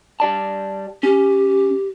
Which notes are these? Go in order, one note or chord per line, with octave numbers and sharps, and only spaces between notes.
G3 D5 A5
C#4 G4